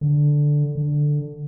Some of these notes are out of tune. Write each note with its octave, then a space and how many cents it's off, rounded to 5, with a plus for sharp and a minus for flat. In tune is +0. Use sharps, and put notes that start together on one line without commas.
D3 +0
D3 +5